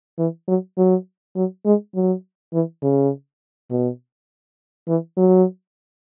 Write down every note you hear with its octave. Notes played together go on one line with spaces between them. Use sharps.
E3
F#3
F#3
F#3
G#3
F#3
E3
C#3
B2
E3
F#3